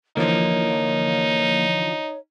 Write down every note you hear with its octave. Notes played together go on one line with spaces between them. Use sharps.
D3 E3 F3 A#3 D#4 C#5